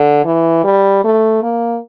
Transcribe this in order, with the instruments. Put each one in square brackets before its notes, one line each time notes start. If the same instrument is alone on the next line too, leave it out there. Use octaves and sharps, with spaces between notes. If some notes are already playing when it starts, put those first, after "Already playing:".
Already playing: [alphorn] D3
E3
G3
A3
A#3